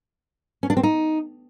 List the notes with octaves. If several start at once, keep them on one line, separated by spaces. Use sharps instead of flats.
C#4
D4
C4
D#4